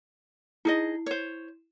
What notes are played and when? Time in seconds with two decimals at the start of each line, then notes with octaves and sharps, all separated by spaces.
0.65 D#4 E4 G#4 D#5
1.06 C5 C#5